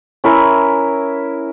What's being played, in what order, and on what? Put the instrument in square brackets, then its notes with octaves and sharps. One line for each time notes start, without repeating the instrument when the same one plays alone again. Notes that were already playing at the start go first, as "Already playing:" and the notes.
[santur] C#4 E4 A#4 E5